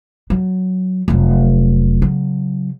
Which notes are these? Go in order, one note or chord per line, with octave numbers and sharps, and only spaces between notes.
F#3
F1 F#3
C#3 F#3